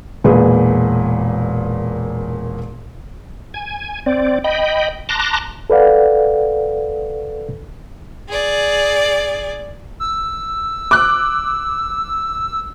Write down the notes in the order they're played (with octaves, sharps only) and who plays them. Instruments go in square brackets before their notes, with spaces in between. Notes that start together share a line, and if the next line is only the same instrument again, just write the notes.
[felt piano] E1 A#2 G#4 B4
[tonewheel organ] G#5
C4 D5
D#5 G5 B5
A5 A#5 C6 D6 F#6 A#6
[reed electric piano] A4 B4 D5 F5 F#5
[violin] G#4 D5
[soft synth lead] E6
[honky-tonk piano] D6 F#6